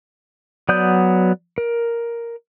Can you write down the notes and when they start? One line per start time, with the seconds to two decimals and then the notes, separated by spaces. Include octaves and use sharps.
0.69 F#3 B3 D5 D#6 G6
1.58 A#4